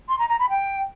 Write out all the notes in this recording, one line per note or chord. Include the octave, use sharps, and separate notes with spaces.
C6
A#5
A#5
B5
G5